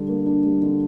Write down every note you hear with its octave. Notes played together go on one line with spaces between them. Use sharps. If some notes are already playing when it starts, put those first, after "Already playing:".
Already playing: D3 G3 D4
A#3
D4
G3
D3